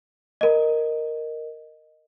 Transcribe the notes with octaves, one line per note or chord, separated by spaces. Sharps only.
A#4 D#5